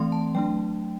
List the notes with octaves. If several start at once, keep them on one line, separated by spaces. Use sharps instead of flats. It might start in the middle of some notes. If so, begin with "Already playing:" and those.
Already playing: E3 A3 C4 C6
A5
F#3 A3 D4 G5